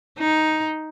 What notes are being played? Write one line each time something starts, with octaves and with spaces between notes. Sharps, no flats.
D#4